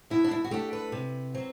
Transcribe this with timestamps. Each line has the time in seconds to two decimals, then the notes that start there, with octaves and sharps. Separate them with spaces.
0.10 B2 E4
0.24 D4
0.31 E4
0.44 F#4
0.51 A3 D4 G4
0.73 B4
0.92 C3
1.34 F#3 C4